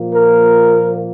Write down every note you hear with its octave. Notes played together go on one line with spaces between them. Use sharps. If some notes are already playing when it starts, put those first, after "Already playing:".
Already playing: A#2 F3 A#3
A#4